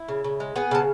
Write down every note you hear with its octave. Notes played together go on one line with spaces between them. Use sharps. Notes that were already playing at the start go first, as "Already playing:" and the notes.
Already playing: E4
C#3
C#3
G#3
B3 G#4
C#3 A4